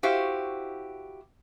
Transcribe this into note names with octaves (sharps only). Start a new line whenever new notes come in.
E4 F#4 G4 C5 F5